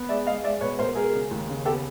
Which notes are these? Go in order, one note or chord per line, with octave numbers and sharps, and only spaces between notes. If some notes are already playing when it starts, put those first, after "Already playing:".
Already playing: B3
G#3 D5 E5
G#3 D#5 F5
G#3 D5 E5
B2 B4 C#5
B2 A#4 C5
G#3 G#4 A#4
C#3
D#2
C#3
B3 G4 A4